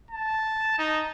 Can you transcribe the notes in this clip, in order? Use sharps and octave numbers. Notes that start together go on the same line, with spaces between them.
A5
D#4